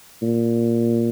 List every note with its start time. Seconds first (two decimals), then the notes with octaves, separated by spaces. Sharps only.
0.22 A#2